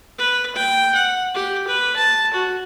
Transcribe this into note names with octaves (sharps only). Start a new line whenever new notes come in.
B4
G5
F#5
G4
B4
A5
F#4